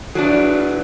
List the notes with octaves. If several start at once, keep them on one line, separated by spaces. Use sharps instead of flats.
F#3 D4 G#4 B4 D5